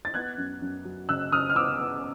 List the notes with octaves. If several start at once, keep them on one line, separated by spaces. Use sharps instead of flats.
A6
B3 F#6 G#6
F#2
F#2
F#3
C#3 E6 F#6
C#3 D#6 F6
F6
B3 D6 E6
B3